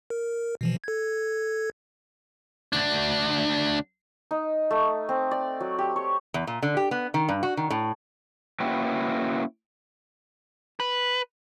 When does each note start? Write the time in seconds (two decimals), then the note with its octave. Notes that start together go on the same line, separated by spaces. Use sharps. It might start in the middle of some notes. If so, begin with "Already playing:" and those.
0.10 A#4
0.61 B2 E3 F3
0.84 A4 G#6
2.73 D2 D4
4.31 D#4
4.71 A3
5.09 C4
5.31 D5
5.60 F#3
5.79 G4
5.96 C#5
6.34 E2
6.47 A#2
6.63 D3
6.77 G4
6.91 B3
7.14 D#3
7.29 G2
7.43 F#4
7.57 D#3
7.70 A2
8.60 A#3 C#4 E4 F#4 B4 G5
10.80 B4